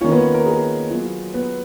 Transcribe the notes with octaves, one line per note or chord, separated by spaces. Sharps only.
D#3 A#3 C#4 F4 C#5
B3 B4
A#4
G#4
F#3 B3 F4
B3 B4